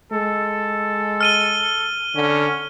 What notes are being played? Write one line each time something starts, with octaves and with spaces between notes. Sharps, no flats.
G#3 A4
F6 D#7 G7
D3 C#4